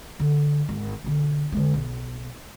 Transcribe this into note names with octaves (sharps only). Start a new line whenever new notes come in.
D3
G#1
B1 D3
D3 G#3
B1